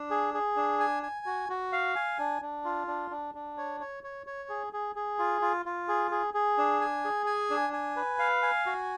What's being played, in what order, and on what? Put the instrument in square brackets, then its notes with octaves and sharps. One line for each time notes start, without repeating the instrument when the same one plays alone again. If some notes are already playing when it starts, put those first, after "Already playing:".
Already playing: [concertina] D4
G#4
G#4
D4
G#5
G#5
F#4
F#4
F5
G#5
D4
D4
F4
D4
D4
D4
C#5
C#5
C#5
C#5
G#4
G#4
G#4
F4
F4
F4
G#4
G#4
G#4
D4
G#5
G#4
G#5
D4
G#5
B4
F5
G#5
F#4